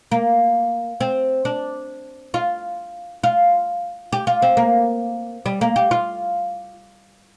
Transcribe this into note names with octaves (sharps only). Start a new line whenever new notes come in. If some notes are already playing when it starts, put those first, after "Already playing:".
A#3
C4
D4
F4
F4
G4
F4
C4
A#3
G3
A#3
G4
F4